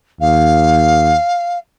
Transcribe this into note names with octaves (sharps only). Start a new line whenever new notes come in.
D#2 F5